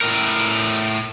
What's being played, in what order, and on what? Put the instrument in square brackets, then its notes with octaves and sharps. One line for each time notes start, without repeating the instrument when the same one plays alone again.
[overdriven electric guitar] A2 A#4